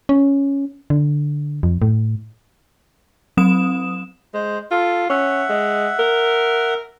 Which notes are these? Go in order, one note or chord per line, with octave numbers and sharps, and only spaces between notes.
C#4
D3
F2
A2
F#3 C4 D#6 E7
G#3 C5
F4 A4
C#4 E5 F#5
G#3
A#4